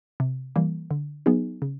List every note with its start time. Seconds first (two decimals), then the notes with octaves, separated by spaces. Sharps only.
0.20 C3
0.56 E3 G3 A#3
0.91 D3
1.26 F#3 B3 D#4 G#4
1.62 C#3